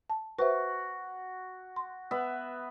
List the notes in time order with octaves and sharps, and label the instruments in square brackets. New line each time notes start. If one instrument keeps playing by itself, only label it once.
[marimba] A5
[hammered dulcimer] F#4 [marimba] B4 C5 E5
[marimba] C6
[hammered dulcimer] B3 B4 E5